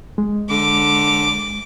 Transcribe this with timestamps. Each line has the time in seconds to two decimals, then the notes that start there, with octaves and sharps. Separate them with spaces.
0.18 G#3
0.51 D3 D6